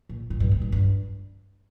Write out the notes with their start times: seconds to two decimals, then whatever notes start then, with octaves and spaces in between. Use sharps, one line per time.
0.09 A#2
0.30 A#2
0.40 G2
0.51 F2
0.61 G2
0.72 G2